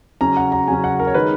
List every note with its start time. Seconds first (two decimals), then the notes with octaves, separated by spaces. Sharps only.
0.21 C#3 F#3 C#4 A#5
0.37 F#5
0.52 A#5
0.68 C#3 F#3 C#4 G#5
0.84 F#5
1.00 A#4
1.07 C#5
1.14 D#3 G#3 D#4 B4